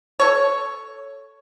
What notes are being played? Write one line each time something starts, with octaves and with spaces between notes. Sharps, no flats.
A4 C#5